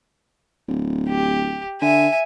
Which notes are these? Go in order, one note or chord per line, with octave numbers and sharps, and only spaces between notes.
D1
G4
D3 E5 G#5